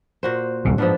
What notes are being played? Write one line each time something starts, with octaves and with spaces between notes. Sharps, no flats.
A#2 F#4 C5
D1 C2 B2
G#2 F3 B3 D4